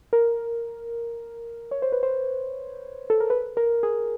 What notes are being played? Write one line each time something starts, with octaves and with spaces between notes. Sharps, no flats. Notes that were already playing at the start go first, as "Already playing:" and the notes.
A#4
C#5
C5
B4
C5
A4
A#4
B4
A#4
G#4